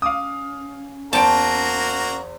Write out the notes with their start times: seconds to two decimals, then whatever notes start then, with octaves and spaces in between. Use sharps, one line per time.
0.02 C#4 F5 D6 D#6
1.13 E2 A#3 F#4 C5 G5 A5 A#5 D7